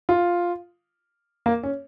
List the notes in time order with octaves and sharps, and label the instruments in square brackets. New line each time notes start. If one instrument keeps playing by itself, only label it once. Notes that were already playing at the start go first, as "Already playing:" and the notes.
[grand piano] F4
A#3
C#4